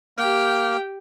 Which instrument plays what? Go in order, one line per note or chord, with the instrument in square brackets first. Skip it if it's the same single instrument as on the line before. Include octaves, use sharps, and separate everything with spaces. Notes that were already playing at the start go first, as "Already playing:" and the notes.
[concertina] A#3 F6 [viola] G4 G5